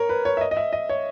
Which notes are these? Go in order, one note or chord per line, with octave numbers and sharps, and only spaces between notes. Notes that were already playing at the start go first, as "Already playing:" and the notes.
Already playing: A#4 C#5
B4
C#5
E5
D#5
D#5
E5
D#5
C#5